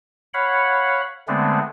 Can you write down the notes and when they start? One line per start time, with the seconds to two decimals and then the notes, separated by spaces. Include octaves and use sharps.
0.34 C#5 F5 F#5 B5
1.28 D3 G#3 A3 B3 C4 D4